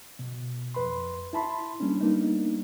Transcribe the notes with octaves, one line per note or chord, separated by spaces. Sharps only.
B2
F2 B4 B5 C6
E4 A5 B5 C6
G3 A#3 C#4 D4
G3 A#3 B3 D4 D#4